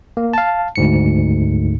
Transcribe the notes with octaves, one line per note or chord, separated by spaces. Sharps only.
A#3
F5 A5
D2 G#2 C#7